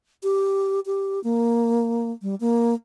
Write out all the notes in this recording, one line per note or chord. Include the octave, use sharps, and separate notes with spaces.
G4
G4
A#3
G3
A#3